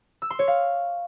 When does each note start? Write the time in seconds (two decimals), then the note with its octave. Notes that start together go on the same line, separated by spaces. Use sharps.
0.22 E6
0.30 C6
0.39 C#5
0.48 F5